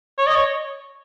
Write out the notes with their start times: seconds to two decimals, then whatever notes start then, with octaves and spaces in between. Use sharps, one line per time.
0.18 C#5
0.27 D#5
0.35 C#5